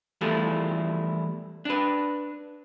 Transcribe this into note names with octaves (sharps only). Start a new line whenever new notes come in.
E2 F3 G3 A3 E4 F4
D4 B4